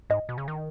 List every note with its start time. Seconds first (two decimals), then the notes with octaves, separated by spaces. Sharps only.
0.10 G#2 D#5
0.29 B2
0.38 C#3
0.48 D#3